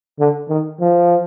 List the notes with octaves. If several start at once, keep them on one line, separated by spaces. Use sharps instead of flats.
D3
D#3
F3